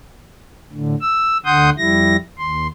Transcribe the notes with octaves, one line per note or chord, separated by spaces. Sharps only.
A2 D3
E6
D2 D3 F#5 C6 D#6 G6
F2 G3 E4 A#6
D#2 C6